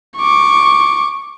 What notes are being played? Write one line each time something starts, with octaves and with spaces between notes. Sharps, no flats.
C#6 D6